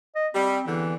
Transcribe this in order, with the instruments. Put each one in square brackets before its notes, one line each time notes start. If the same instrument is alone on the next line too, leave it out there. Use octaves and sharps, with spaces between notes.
[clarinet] D#5
[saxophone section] G3 [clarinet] C4
[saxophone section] E2 D3 [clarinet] E3